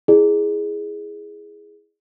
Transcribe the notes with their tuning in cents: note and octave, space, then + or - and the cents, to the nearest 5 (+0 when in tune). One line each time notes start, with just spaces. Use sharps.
E4 +0 G#4 +0 D5 +35